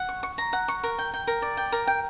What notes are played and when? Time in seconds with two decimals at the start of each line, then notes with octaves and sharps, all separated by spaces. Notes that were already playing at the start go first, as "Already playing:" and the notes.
Already playing: F#5
0.09 C#6
0.23 C#6
0.38 A#5
0.53 F#5
0.68 C#6
0.83 A#4
0.98 G5
1.13 G5
1.27 A#4
1.42 D5
1.57 G5
1.72 A#4
1.87 G5